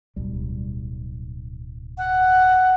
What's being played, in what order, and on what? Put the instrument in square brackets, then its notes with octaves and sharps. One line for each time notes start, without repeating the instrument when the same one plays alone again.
[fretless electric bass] D1 B1 G3
[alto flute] F#5